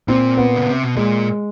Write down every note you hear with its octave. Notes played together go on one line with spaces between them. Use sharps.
A#2 C4
B3
C#3
C3
B2
A#2 G#3